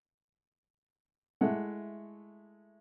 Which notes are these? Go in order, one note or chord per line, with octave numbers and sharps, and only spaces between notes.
G#3 A3 E4 F#5